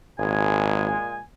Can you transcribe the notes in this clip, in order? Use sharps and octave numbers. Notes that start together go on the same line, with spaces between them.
G#1 A#2 G#3 G#5